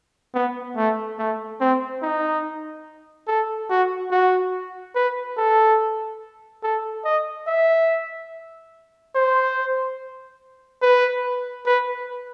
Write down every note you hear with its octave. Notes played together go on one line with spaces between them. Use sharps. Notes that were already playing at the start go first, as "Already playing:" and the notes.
B3
A3
A3
C4
D#4
A4
F#4
F#4
B4
A4
A4
D#5
E5
C5
B4
B4